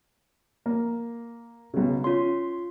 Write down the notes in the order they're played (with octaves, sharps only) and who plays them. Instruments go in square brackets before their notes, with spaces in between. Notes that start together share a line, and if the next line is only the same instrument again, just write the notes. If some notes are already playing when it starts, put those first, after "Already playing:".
[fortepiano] A#3
B1 C#3
[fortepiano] C#4 [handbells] F4 C6